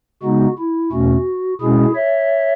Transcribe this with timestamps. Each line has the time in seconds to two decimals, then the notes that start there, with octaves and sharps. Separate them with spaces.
0.23 C#3 G#3 B3 D#4 F#4
0.58 E4
0.92 E2 B2 A3 C#4 F#4
1.61 B2 G#3 C#4 E4 G#4
1.95 C#5 E5